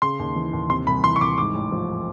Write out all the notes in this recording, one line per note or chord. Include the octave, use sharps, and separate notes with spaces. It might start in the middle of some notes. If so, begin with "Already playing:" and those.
C#3 C6
D#2
E3
D#2
C3 C6
C2 B5
E3 C6
C#6
C2 D6
G#2 D6
A1
F3